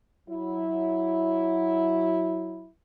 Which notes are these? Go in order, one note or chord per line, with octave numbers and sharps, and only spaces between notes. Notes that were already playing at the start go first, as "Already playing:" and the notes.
F#3 E4